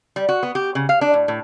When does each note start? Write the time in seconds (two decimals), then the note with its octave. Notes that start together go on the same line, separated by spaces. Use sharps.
0.16 G3
0.29 F#4
0.43 B3
0.55 G4
0.75 C#3
0.89 F5
1.01 D4
1.14 A2
1.28 A2